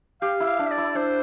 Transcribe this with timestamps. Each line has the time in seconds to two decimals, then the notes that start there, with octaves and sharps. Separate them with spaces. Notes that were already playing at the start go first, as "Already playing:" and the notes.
0.22 G4 F5
0.40 E4
0.47 F5
0.59 D4
0.66 E5
0.71 D5
0.78 E4
0.95 D4 C5